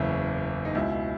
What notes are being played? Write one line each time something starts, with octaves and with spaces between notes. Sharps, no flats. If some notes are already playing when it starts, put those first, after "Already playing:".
Already playing: F#1 E2 C#3 E4
D#4
C#2 B2 E4